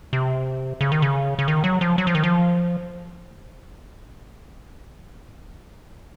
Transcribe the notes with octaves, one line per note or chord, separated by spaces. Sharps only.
C3
C#3
D#3
C#3
C#3
D#3
F#3
F3
F#3
F3
D#3
F3